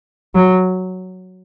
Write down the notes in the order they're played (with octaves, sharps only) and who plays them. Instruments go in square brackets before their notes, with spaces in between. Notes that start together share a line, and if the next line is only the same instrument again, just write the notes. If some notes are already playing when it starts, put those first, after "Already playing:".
[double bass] F#3